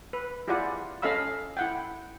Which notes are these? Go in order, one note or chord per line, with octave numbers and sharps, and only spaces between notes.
B4
E4 F4 G4 G#4 D5 F#5
C#4 A4 D#5 F5 B5 E6
E4 F#5 G5